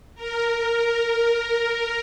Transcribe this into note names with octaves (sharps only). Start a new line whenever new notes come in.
A#4
A#4